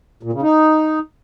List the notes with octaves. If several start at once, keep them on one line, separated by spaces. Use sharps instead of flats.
A#2
C#3
D#4